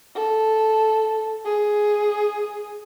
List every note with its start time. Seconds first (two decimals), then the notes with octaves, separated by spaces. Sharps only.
0.15 A4
1.45 G#4